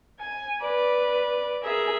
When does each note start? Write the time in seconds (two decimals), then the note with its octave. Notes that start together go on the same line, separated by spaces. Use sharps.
0.20 G#5
0.61 B4 D5
1.63 G#4 A#4 E5